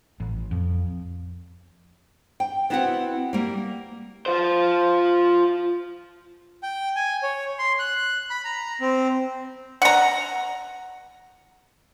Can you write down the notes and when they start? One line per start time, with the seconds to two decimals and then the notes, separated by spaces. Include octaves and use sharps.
0.20 A1
0.51 F2
2.40 G5
2.70 B3 C4 E4 F#4 E5 F#5
3.33 G3 A#3
4.26 F4 C5
6.63 G5
6.96 G#5
7.23 C#5
7.59 C6
7.79 F#6
8.30 B5
8.45 A#5
8.81 C4
9.82 F#5 A#5